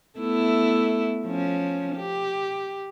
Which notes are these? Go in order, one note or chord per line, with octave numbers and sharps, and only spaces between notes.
A3 B3 E4
F3 C#4
G4